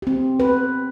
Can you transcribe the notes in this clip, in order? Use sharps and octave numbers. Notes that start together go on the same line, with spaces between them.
C4 G4
B4